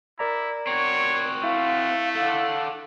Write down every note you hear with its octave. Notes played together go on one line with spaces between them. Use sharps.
E4 A#4 D5 A#5
C4 F#4 C#5
A3 E4 F5
A4 F5 F#5